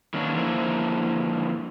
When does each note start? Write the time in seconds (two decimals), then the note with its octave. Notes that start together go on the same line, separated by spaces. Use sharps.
0.14 D#3 F#3 A#3 B3 C#4 D4
0.34 D3 F3 A#3 E4